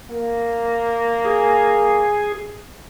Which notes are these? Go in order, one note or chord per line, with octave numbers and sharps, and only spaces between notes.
A#3
G#4